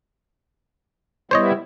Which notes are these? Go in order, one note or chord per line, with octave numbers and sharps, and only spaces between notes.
G3 B3 E4 C5 C#5 D#5